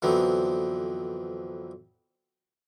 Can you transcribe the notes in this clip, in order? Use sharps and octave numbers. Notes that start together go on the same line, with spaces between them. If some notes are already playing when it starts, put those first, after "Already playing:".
F2 D3 E3 F#3 B3 C4